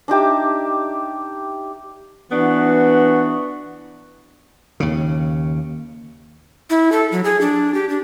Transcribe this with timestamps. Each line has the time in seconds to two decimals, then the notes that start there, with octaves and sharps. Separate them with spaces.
0.08 D4 D#4 G4 E5
2.32 E3 B3 D4 F#4
4.80 D#2 C#3
6.70 E4
6.92 A4
7.12 F#3
7.24 G#4
7.41 D4
7.74 G4
7.89 D4